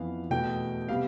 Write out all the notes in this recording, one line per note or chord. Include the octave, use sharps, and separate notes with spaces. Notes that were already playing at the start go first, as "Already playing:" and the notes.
Already playing: F2 E3 B3 F5
E2 B2 A3 G5
C3 G3 B3 F5